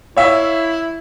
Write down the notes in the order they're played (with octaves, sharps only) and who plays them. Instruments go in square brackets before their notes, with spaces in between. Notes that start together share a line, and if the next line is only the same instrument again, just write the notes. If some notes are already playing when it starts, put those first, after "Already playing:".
[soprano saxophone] E4 [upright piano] C#5 E5 F5